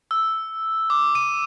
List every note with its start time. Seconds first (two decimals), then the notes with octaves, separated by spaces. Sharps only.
0.11 E6
0.90 D6
1.15 D#7